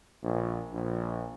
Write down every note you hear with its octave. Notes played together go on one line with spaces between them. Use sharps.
A#1
A#1